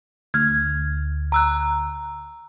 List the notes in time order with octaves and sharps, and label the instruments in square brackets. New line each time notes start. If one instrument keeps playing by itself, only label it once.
[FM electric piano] D2 [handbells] F6 G#6
[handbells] A#5 E6 F#6